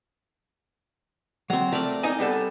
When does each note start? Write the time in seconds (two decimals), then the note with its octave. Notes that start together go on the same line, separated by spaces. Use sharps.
1.50 F#3 C4 A#5
1.72 A3 A#4 D5
2.03 D#4 D#5 G#5
2.20 G3 B3 A4